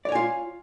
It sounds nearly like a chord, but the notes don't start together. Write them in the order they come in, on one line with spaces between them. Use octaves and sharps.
D5 C#5 G#5 F4